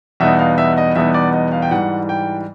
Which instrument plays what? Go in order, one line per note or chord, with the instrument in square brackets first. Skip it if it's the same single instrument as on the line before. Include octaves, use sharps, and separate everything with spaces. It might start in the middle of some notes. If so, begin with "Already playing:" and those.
[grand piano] E2 B2 G3 B3 D#4 E5
F5
E5
D#5
E2 B2 G3 B3 D#4 E5
D5
D#5
F5
G5
G#2 E3 G3 F#5
G5